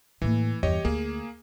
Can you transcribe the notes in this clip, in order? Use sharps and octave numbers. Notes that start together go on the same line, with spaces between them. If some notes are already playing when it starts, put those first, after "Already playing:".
A2 E3 A#3
E2 G2 G4 C#5 D#5
D2 A#3 G#4